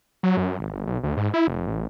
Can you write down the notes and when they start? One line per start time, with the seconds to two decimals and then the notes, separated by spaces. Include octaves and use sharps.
0.23 F#3
0.37 F#2
0.59 G#1
0.72 G1
0.87 B1
1.03 D2
1.17 G#2
1.34 E4
1.47 F1
1.67 A1